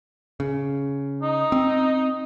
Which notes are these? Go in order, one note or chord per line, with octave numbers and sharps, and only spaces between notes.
C#3
D#4
C4